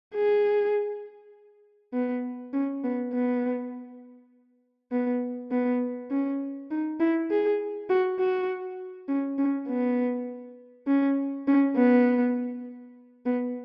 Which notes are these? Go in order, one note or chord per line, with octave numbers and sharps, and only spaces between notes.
G#4
B3
C#4
B3
B3
B3
B3
C#4
D#4
E4
G#4
F#4
F#4
C#4
C#4
B3
C#4
C#4
B3
B3